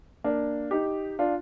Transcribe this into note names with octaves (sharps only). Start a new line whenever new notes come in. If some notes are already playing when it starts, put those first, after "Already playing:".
A#3 D4
D#4 G4
D4 F4